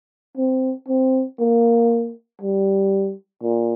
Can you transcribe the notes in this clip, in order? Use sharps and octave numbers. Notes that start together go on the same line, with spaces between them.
C4
C4
A#3
G3
A#2